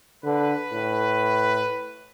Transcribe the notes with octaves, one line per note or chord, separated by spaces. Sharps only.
D3 B4
A2